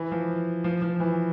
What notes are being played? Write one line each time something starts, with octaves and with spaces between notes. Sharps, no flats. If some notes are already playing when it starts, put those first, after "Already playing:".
Already playing: E3
F3
F3
F3
E3